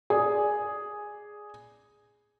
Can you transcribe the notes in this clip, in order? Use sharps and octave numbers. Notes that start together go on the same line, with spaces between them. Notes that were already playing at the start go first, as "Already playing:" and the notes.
G#4 D5